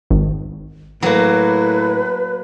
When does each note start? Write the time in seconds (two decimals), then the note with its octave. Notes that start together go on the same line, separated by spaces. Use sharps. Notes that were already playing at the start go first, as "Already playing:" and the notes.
0.11 G#1
1.02 A2 F#3 A#3 B4